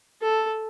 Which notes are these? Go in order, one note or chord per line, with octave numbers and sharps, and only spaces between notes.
A4